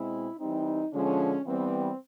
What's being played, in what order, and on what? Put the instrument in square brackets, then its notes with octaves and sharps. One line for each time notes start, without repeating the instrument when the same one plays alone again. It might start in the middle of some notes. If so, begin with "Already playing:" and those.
Already playing: [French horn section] B2 G#3 C4 E4
E3 G3 C4 D#4
D3 F3 G#3 C#4
E3 G3 B3 C4